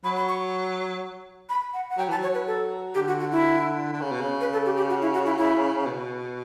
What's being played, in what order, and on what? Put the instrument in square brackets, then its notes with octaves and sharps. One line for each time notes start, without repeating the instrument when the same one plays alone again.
[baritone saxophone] F#3 [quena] B5
[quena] B5
C#6
B5
F#5
F#5
[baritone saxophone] F#3 [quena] G5
[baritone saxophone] E3 [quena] A5
[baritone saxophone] F#3 [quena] C#5
[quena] B4
A4
[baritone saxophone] D3 [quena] G4
[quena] F#4
F#4
E4
[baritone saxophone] D3
C#3
B2
C#3
[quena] B4
A4
G4
G4
F#4
E4
F#4
E4
E4
[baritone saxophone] B2